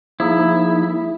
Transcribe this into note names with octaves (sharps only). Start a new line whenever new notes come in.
F3 A#3 D#4 E4 G#4